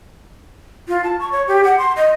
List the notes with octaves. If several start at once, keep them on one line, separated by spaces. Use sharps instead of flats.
F4
A5
C#6
C#5
G4
F#5
C6
D#5